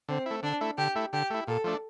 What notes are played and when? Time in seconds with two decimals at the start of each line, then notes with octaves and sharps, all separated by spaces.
0.09 D3 C4
0.26 A3 E4
0.43 D3 D4
0.61 A3 E4
0.77 D3 G4
0.95 A3 E4
1.13 D3 G4
1.30 A3 E4
1.47 A#2 A4
1.64 F3 A3 D4